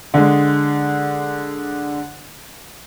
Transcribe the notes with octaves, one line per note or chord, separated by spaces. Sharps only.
D3 G#3